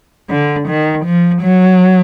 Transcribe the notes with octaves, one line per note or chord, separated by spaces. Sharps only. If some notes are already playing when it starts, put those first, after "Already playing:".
D3
D#3
F3
F#3